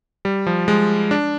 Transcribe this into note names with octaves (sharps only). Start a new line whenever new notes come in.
G3
F3
G#3
D4